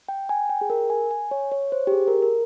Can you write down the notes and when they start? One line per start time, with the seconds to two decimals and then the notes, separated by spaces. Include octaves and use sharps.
0.09 G5
0.29 G#5
0.49 G5
0.61 G#4
0.70 A#4
0.90 G#5
1.11 G#5
1.31 C#5
1.52 C#5
1.72 C5
1.87 G4
1.92 G#4
2.07 A#4
2.22 A#4